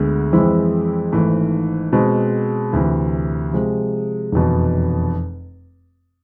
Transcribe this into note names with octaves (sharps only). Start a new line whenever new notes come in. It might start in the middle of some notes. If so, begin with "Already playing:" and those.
Already playing: D2 D3 G#3 B3
F2 E3 G#3 C4 E4
G#1 G#2 E3 A3
B2 G#3 C4
D2 C3 E3
C3 F3 G#3
F1 E2 B2